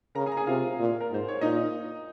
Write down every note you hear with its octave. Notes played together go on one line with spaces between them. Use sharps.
C#3 A#4 A#5
G#4 G#5
A#5
G#4 G#5
C3 F4 F5
A#2
A#4
G#2 C5
C#5
A#2 D#4 D#5